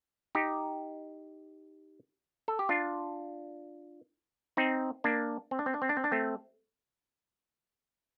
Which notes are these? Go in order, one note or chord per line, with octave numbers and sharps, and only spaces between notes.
D#4 G4
A4
G4
D4 F4
C4 D#4
A#3 D4
C4
D4
C4
D4
C4
D4
C4
D4
A3 C4